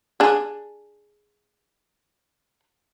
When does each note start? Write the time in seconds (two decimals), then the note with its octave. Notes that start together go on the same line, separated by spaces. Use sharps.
0.20 D4 G#4